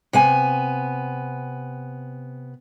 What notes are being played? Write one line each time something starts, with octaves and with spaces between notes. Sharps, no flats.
C3 B3 G#5